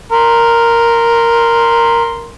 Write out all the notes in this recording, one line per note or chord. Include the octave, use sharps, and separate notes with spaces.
A#4 C6